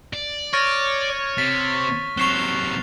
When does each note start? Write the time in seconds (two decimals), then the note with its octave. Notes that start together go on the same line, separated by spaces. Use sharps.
0.13 D5
0.53 C#5 C#6 F6 A6 A#6 D7 D#7
1.38 C3 A6 B6
2.17 C3 F#3 C#6 F#6 C7 E7 F7 G7